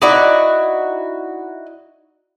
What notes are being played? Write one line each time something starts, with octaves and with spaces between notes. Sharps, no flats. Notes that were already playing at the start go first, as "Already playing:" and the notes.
D#4 E4 F#4 D5